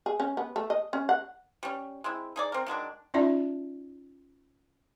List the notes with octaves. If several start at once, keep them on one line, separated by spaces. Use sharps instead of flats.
G#4
C#4
B3
A3
D#5
C#4
F#5
G3 C#4
G#3 C4 E4
D#4 G#4 D5
C4 A#4
D#3 F#3 G#3 D4
C#4 D#4 F4 D5 E5 A5